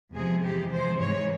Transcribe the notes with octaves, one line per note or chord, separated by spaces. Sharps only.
E2 C3 F3 G#3 G#4
F2 C3 E3 G#3 G4
E2 C3 F3 G#3 C5
G#2 E3 G#3 C#5